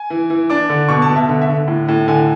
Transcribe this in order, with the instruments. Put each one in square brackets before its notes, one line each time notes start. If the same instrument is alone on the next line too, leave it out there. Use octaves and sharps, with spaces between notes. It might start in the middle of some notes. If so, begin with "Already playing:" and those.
Already playing: [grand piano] G#5
E3
E3
D4 D6
D3
B2 C#6
A5
B2
E5
D3
E5
D3
A2
A2
D3 G#5